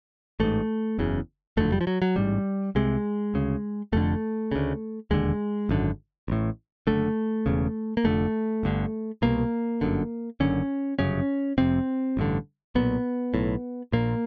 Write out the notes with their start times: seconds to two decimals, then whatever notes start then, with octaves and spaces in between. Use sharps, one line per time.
0.40 A1 G#2 A3
0.99 F#1 E2 C#3
1.57 F#1 F2 D3 A3
1.72 G3
1.81 F3
1.87 F#3
2.02 F#3
2.16 A1 G#2 G3
2.75 C2 C3 G#3
3.34 D2 C#3
3.92 F1 F2 D3 A3
4.52 D2 C#3
5.11 E1 D#2 D3 G#3
5.69 G#1 F#2 D3
6.28 A1 A2
6.87 F#1 F2 D3 A3
7.46 E1 E2 C#3
7.97 A#3
8.04 F1 F2 D3 A3
8.63 G1 G2 D3
9.22 C2 B2 A#3
9.81 G1 F#2 D3
10.40 F#1 F#2 D3 C#4
10.99 G1 F#2 C#3 C#4
11.58 F1 F2 C3 C4
12.17 A1 G2 D3
12.75 B1 A#2 B3
13.34 B1 A2
13.92 A#1 A#2 A#3